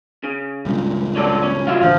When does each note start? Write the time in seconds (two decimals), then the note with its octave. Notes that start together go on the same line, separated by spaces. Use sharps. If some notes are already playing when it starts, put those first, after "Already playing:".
0.24 C#3
0.65 C#2 G2 A#2
1.16 C#4 A4 D5
1.43 C#4
1.67 F4 F#4 E5
1.81 A1 A2 D3 C5 F5